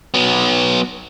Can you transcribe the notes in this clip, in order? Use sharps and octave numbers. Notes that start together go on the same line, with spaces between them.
F#3 B3